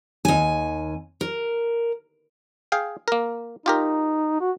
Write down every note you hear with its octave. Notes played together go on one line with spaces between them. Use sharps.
D#2 G#5
A#4
G#4 F5 G5
A#3 A#4
D#4 F4 G4 A#4
F#4